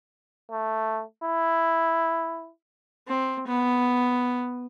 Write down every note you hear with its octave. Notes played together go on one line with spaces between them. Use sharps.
A3
E4
C4
B3